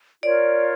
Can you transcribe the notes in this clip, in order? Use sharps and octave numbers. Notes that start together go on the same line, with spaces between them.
F4 A#4 C#5 D5